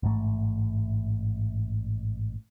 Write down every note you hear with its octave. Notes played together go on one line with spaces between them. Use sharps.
A1 G#2 A3